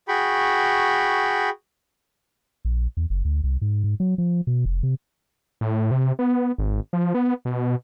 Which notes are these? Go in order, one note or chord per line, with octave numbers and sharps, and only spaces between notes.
F#4 G#4 G5 B5 C#6
A#1
E2
F#1
D2
C2
G#2
G#2
F#3
F3
B2
F1
C3
A2
C3
B3
G#1
F3
B3
B2